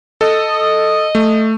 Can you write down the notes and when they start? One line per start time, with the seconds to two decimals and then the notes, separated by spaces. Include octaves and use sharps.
0.21 A4 D#5
1.15 A3